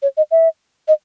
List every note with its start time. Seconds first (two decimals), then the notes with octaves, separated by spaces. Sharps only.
0.02 C#5
0.17 D#5
0.31 E5
0.88 D#5